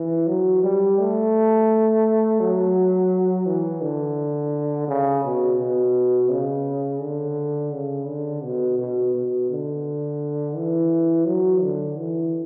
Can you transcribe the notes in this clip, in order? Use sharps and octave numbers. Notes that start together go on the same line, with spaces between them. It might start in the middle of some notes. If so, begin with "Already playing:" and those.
Already playing: E3
F#3
G3
A3
F#3
E3
D3
C#3
B2
B2
C#3
D3
C#3
D3
B2
B2
B2
D3
E3
F#3
D3
E3